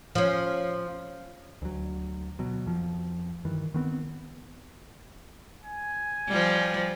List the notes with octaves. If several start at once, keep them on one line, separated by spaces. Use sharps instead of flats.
F3 C#4
D2 F#3
B2 F#3
F2 F3
G2 D#3 E3
D#3 B3 C4
G#5
F3 G3